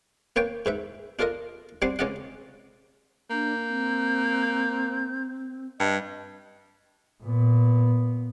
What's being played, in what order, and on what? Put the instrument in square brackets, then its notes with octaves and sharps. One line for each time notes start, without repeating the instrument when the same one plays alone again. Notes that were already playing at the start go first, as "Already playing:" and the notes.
[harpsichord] A#3 B4 C#5 G5
G#2 B4 E5
D4 F4 A4 A#4 D#5
G3 C4 D4 F#5 C6
C#2 C#4 D5 D#5 F#5
[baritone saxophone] A#3 [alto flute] D4 [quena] G6
[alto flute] C4
[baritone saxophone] G2 [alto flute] D#5
[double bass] A#2 B3